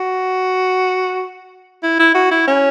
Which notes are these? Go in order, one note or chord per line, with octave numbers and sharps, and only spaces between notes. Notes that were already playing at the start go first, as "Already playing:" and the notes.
Already playing: F#4
E4
E4
F#4
E4
C#4